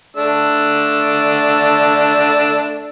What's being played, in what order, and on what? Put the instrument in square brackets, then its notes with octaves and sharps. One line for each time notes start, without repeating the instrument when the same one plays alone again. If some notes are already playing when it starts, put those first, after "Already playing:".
[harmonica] A3 D4 E6